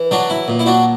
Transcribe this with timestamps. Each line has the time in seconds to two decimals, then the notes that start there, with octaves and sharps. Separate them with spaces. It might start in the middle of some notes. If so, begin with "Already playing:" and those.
Already playing: E3
0.11 F#3 D4 F#4
0.30 E4
0.48 A#2
0.59 E4
0.66 D4 F#4